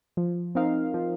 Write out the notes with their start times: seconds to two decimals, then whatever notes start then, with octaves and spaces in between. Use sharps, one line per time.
0.17 F3
0.55 C4 D#4 A#4 F5
0.94 F3